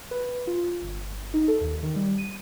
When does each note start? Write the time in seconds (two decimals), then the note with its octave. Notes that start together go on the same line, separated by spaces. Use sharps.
0.11 B4
0.47 F4
0.82 G1
1.34 D#4
1.48 A4
1.61 D#2
1.83 D#3
1.96 G3
2.18 D#7